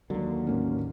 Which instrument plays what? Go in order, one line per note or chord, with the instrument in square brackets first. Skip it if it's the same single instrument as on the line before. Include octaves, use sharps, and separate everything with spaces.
[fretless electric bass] D#2 D3 [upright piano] F#3 [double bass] A#3
[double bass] A1 [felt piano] A#3 C#4